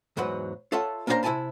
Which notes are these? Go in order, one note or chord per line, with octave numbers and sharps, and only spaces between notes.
E2 G#2 F#3 B4 F#5
F4 A4 C#5 E5 F#5 A5
A#3 C#4 D4 E4 C5 A#5
C3 E4 D5 G#5 A5 B5